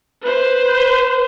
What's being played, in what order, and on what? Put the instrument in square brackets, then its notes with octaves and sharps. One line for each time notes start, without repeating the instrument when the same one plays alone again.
[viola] B4 C5